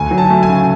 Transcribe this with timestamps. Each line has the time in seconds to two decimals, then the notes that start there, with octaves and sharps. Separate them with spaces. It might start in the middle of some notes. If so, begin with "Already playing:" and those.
Already playing: D2 G#5
0.11 F#3
0.18 A5
0.30 A3
0.43 G#5
0.49 C#3